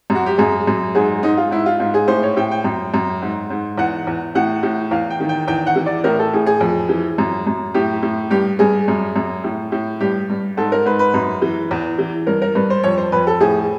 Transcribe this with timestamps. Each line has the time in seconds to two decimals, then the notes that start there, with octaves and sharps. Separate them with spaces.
0.10 F#2
0.15 F#4
0.26 G4
0.38 F#2 G#4
0.67 F#2
0.95 G#2 G#4
1.23 G#2 D#4
1.37 F4
1.51 G#2 E4
1.66 F4
1.79 G#2 F4
1.94 G#4
2.08 A2 C5
2.23 C#5
2.37 A2 G5
2.51 G5
2.64 F#2
2.94 F#2
3.22 G#2
3.50 G#2
3.78 E2 F#5
4.07 E2
4.35 A2 F#5
4.63 A2
4.91 E2 F5
5.10 G5
5.20 D#3
5.29 G5
5.48 E2 G5
5.67 F#5
5.76 E3
5.86 D5
6.04 A2 A#4
6.19 A4
6.33 A2 G#4
6.46 G#4
6.61 F2
6.89 E3
7.18 F#2
7.47 F#2
7.74 A2 G4
8.02 A2
8.31 G2 G4
8.59 G2 G#4
8.88 F#2
9.16 F#2
9.44 A2
9.72 A2
10.00 G2 G4
10.30 G2
10.57 G#2 A4
10.72 A#4
10.86 G#2 B4
10.99 B4
11.14 F#2
11.42 E3
11.71 E2
11.98 E3
12.27 G2 A#4
12.42 A#4
12.55 G2 B4
12.70 C5
12.83 F2 C#5
12.98 C5
13.12 F2 B4
13.27 A4
13.40 A2 G#4